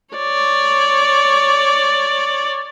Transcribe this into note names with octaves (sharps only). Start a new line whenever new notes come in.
C#5 D5